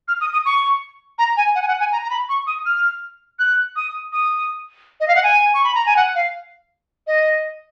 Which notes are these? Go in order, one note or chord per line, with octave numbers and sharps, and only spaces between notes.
F6
D#6
D#6
C#6
A#5
G#5
F#5
G#5
F#5
G#5
A#5
A#5
B5
C#6
D#6
F6
F#6
D#6
D#6
D#5
F5
F#5
G#5
C#6
B5
A#5
G#5
F#5
F5
D#5